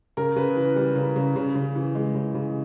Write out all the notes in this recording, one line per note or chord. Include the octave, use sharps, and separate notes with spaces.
C#3 A#4
C#3 B4
E3 B4
G3
C#3
C#3
C#3
C#3
E3
G#3
C#3
C#3